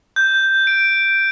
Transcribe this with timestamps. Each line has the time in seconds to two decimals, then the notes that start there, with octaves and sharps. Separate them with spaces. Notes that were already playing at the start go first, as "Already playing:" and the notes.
0.16 G6
0.67 D7